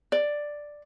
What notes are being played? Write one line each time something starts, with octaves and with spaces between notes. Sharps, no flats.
D5